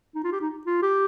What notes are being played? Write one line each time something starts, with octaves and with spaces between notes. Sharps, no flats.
D#4
F4
G4
D#4
F4
G4